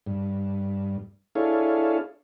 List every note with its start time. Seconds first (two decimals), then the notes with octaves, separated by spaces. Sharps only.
0.07 G2
1.35 D4 E4 G#4 A4 C#5 F5